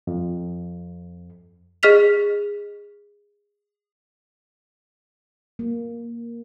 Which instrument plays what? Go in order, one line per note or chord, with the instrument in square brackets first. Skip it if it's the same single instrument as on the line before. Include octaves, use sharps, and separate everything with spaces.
[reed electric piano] F2
[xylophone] G#4 D#5 F6 B6 F7
[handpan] A#3